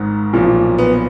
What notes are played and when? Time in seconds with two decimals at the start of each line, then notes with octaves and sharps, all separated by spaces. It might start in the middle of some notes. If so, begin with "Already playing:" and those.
Already playing: G#1 G#2 D#3
0.33 B1 A#2 F3
0.78 B3